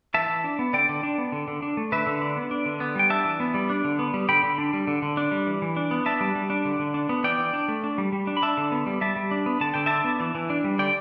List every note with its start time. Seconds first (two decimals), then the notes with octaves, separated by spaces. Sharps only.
0.14 E3 E5 A5
0.29 E3
0.44 D4
0.59 B3
0.73 D3 D5 G5
0.89 D3
1.03 D4
1.18 B3
1.32 D3
1.48 D3
1.62 D4
1.77 A3
1.92 D3 B4 E5
2.07 D3
2.21 D4
2.36 B3
2.51 D4
2.66 D3
2.80 B3
2.95 G3 G5
3.10 D4 E5 A5
3.25 E3
3.40 B3
3.54 G3
3.70 D4
3.84 D3
3.99 B3
4.14 G3
4.29 D3 G5 B5
4.43 D3
4.58 D4
4.73 G3
4.87 D3
5.02 D3
5.17 D4
5.32 G3
5.47 E3
5.62 E3
5.76 D4
5.91 B3
6.06 D4 E5 A5
6.21 G3
6.35 G3
6.50 D4
6.65 D3
6.79 D3
6.94 D4
7.09 B3
7.24 E3 D5 G5
7.38 E3
7.54 D4
7.68 A3
7.84 D4
7.98 G3
8.12 G3
8.27 D4
8.37 B5
8.42 D4 E5 A5
8.57 D3
8.72 B3
8.87 G3
9.01 G3 E5 A5
9.16 G3
9.31 D4
9.46 B3
9.61 D3 A5
9.74 D3 G5
9.86 D4 E5 A5
10.04 B3
10.20 E3
10.35 E3
10.50 D4
10.64 G3
10.79 D3 D5 G5